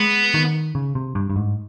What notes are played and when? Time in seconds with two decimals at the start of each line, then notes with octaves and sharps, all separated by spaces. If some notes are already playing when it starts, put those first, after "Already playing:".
Already playing: G#3 B3
0.34 D#3
0.75 C#3
0.95 C3
1.15 G2
1.30 G2
1.36 G#2